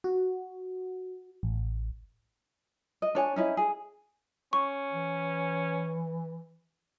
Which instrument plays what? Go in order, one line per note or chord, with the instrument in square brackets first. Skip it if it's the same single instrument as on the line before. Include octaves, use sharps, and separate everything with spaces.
[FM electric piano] F#4
A1
[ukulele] D#5
D4 C#5 G#5
C#4 D#4 E4
G#4
[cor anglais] C#4 [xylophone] C#6
[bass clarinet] E3